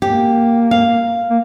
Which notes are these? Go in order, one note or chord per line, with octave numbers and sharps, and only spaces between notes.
A#3 G4
F5
A#3